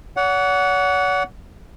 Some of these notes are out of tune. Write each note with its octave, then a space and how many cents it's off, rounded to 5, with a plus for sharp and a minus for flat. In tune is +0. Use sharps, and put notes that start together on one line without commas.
C#5 +45 F#5 +0